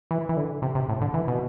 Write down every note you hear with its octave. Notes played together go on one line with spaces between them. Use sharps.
E3
E3
D3
C3
C3
A2
D3
E3
B2